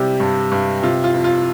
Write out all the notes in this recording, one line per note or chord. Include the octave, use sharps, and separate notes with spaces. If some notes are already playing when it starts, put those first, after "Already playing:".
Already playing: C3 G3 G4
G2
G2
C3 F4
F4
F2
F4